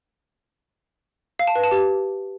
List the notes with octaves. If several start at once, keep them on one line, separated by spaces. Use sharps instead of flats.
F5
A5
B4
A5
G4